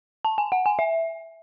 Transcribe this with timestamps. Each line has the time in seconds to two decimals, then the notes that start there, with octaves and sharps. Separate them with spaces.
0.25 A5
0.38 G#5
0.52 F#5
0.66 G#5
0.79 E5